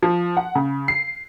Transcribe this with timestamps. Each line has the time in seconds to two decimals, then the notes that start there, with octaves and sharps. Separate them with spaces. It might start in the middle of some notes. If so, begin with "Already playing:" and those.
0.03 F3
0.37 F#5
0.55 C#3
0.88 C7